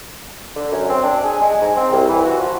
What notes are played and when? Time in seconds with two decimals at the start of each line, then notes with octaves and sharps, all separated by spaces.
0.56 D3
0.72 F#2
0.90 C4
1.04 D4
1.23 G#4
1.41 G#3
1.61 G#2
1.77 C4
1.92 C2
2.09 E3
2.25 F#4
2.39 F3